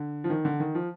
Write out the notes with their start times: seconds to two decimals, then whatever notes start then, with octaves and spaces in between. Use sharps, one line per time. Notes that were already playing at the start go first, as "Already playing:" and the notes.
Already playing: D3
0.24 F3
0.30 D#3
0.45 D3
0.60 D#3
0.75 F3